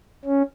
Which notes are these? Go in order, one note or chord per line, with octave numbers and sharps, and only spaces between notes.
C#4